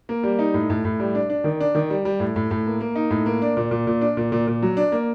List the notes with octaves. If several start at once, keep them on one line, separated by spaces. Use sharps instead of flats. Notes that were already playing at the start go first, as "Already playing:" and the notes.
A#3
G3
D#4
A2
A2
A2
G3
D4
D4
D#3
D4
D#3
G3
G3
A2
A2
A2
A#3
A#3
D#4
A2
A#3
D4
A#2
A#2
A#2
D4
A#2
A#2
A#2
F#3
D4
A#3